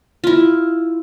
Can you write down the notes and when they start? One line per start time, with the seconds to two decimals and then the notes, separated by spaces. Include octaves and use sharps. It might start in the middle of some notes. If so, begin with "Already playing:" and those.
0.24 E4 F4